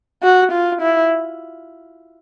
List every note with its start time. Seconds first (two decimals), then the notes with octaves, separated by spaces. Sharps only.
0.23 F#4
0.52 F4
0.81 E4